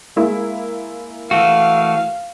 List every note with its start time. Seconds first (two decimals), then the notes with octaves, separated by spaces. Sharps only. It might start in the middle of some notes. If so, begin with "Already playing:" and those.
0.16 G#3 A#3 E4
1.31 E3 A3 F#4 F5